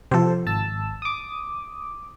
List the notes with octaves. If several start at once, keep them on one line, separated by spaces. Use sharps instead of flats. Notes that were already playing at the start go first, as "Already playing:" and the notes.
C3 F3 A4 C5
G#1 A5 E6
D6 D#6